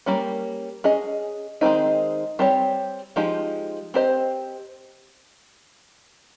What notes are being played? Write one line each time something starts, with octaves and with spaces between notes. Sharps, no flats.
G3 A#3 C#4
C#4 G#4 D#5
D#3 G#3 C4 D#4
G3 C4 G4 C#5
F3 G#3 D#4 G4
C4 G4 C5 D#5